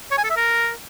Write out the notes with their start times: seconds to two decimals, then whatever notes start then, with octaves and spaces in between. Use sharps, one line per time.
0.11 C#5
0.18 G#5
0.24 A4
0.30 E5
0.36 A#4